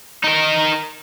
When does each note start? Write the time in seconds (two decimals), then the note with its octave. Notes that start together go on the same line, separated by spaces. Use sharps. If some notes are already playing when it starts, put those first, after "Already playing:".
0.23 D#4 A#4